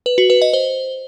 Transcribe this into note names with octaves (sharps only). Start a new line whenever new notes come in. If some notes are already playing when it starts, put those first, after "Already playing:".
B4
F#4
B4
D#5
C5